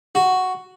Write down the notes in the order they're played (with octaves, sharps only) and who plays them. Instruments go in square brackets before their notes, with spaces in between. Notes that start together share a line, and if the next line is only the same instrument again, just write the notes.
[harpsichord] F#4